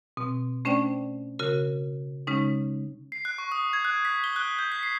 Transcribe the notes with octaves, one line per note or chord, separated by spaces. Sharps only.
B2 C4
A3 C#4 D4 C5 D5 G5
C#3 F#4 A#4
C#3 G#3 C#4 D#4
C7
F#6
C#6
D#6
G#6
F#6
B6
G7
F#6
G6
B6
C7